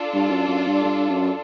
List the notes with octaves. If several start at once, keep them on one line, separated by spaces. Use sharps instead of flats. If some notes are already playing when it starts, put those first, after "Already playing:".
Already playing: D4 F4 A4
G2
F#2
F#2
G2
G2
F#2